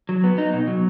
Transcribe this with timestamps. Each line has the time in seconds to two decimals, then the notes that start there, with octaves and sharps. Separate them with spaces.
0.09 F#3
0.24 B3
0.38 D#4
0.54 B2
0.67 F#3